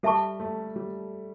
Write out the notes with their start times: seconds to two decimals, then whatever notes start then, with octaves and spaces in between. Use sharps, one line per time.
0.03 G3 A4 E5 A5 C#6
0.40 A3
0.76 G3